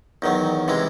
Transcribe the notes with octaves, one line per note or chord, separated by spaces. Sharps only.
E2 D#3 F#3
C3 E3 G#3